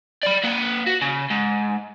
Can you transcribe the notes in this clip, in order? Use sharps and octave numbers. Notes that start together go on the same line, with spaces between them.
D5 B5
A#3 B4
F#4
C#3
G#2